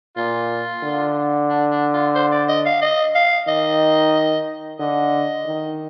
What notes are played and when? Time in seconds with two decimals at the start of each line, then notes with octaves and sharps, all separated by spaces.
0.16 A#2 F4
0.83 D3
1.50 D4
1.71 D4
1.93 F4
2.15 C5
2.32 D5
2.48 D#5
2.65 F5
2.82 D#5
3.15 F5
3.47 D#3 D#5
4.79 D3 D#5
5.46 D#3